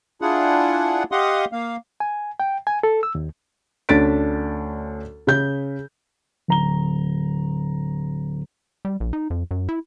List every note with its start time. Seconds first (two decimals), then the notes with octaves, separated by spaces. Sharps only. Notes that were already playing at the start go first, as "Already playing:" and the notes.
0.22 D4 E4 F4 G#4 F#5
1.12 G4 D#5 F5 F#5 C6 D#6
1.52 A#3 F5
2.00 G#5
2.40 G5
2.67 G#5
2.83 A4
3.03 E6
3.15 D#2
3.89 D2 C#4 D4 A6 B6 D7
5.27 C#3 G6
6.48 D1 A#5 G7
8.85 G3
9.00 A#1
9.13 D#4
9.30 F2
9.51 F#2
9.69 E4